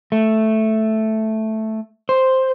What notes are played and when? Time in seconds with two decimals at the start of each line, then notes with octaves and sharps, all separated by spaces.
0.12 A3
2.09 C5